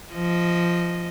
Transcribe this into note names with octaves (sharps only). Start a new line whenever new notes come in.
F3 D#5